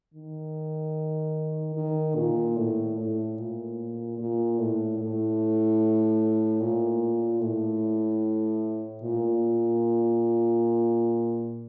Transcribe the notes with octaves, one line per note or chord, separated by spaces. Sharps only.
D#3
D#3
A#2
A2
A2
A#2
A#2
A2
A2
A#2
A2
A#2